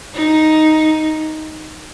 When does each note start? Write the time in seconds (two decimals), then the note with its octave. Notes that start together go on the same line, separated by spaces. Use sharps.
0.14 D#4